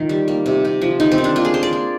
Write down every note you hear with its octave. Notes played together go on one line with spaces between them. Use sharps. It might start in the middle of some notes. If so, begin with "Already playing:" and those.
Already playing: D#3 F4
G3
A#3
C3
C3
F3
D#3 D#4
C4
D#3
D4
A#3 F4
G#4
A#3 C5
D5
A#3